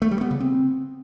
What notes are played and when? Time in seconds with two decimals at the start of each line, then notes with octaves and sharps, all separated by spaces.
0.02 A3
0.11 G3
0.21 B3
0.31 C#3
0.40 C4